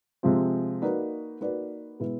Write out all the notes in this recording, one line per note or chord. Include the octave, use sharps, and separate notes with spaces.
C3 F3 G#3 C4 F4
A#3 D#4 F#4 B4 D5
A#3 D#4 F#4 B4 D5
B2 G#3 B3 E4